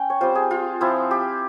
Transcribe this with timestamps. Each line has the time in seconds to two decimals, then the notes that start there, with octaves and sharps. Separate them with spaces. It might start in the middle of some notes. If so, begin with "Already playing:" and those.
Already playing: C#4 G5
0.10 C#5
0.21 G3 C4 F4 C5
0.35 G#4
0.51 F4
0.81 F3 C4 E4
1.11 G4